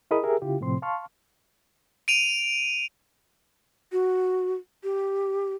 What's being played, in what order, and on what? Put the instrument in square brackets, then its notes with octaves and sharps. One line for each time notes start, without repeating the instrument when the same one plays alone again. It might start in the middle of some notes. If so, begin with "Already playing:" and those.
[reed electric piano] E4 G#4 A#4 D#5 B5 D#6
G4 G#4 A#4 E5
C#3 E4 F4 G4
A2 C3 F3 C4 C6
F5 A5 C6 C#6 F6
[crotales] D7 D#7 F7
[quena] F#4
G4